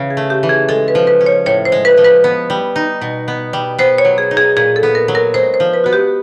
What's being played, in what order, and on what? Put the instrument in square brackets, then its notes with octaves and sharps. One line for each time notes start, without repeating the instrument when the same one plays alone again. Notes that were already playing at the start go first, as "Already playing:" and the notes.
Already playing: [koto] C#3 E3 C#4
[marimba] G#4
[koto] A3
[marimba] G4
[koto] E3
[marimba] G#4
[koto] G#3 [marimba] A4
[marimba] B4
[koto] F3
[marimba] B4
[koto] C#4
[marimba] C#5
[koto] A2 [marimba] C#5
[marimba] C5
[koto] G#3
[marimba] B4
[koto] F3
[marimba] B4
[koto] B3
G3
D#4
B2
B3
G3
[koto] B3 [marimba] C5
[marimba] C#5
[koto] F#3
[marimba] G#4
[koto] D#4
[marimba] G#4
[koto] A#2 [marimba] G#4
[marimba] A4
[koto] B3
[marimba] A#4
[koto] F#3
[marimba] A#4
[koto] G#3 [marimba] C5
[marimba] C5
[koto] F3
[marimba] B4
[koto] B3 [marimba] F#4
[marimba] G4